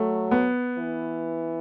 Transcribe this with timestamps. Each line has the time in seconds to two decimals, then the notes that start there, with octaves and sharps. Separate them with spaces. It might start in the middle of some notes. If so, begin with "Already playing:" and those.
Already playing: F#3 A3
0.31 B3
0.78 E3